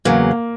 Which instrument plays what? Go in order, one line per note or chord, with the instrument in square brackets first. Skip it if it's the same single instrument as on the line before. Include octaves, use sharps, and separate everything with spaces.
[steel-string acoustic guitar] E2 C#3 F#3 [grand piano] A#3